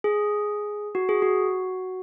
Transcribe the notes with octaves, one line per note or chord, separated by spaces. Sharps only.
G#4
F#4
G#4
F#4